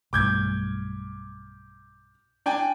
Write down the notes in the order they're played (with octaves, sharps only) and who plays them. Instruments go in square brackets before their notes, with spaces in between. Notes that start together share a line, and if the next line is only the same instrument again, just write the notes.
[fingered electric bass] B1 G2 A3 [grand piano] D6 G6 G#6
[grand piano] D4 G5 G#5